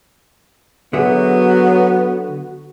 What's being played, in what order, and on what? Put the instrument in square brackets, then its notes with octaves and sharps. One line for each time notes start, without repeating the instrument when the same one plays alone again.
[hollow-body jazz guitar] D3 G#4 E5 [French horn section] F#3 [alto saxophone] B3 [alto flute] F#4